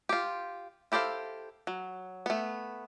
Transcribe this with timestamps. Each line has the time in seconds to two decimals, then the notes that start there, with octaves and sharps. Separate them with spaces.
0.09 F4 G4
0.92 E4 G4 A4 C5 F5
1.67 F#3
2.26 A3 B3